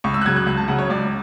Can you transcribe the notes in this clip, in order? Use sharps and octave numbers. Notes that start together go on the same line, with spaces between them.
C#2 C#6
E6
F#6
C#3 F#3 G#6
F#6
C#2 F#6
A5
C#3 F#3 F#5
C#5
C#2 D5